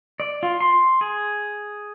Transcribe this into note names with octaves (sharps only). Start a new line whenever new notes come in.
D5
F4
C6
G#4